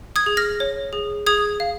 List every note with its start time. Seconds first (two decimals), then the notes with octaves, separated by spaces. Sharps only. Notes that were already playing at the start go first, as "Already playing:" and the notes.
0.16 D#6 G#6
0.26 G#4
0.37 F6 A#6
0.60 C#5
0.93 G#4
1.26 G#4 D#6 G#6
1.60 F5